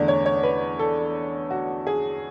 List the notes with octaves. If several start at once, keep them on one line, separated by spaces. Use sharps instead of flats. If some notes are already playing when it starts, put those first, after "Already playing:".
Already playing: E2 D3 A3 D5
C#5
C#5
B4
A4
F#4
G#4